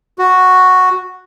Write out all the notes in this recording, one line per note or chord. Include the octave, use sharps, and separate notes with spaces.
F#4